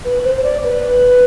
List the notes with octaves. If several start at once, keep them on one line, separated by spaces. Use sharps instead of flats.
B4
C5
C5
D5
B4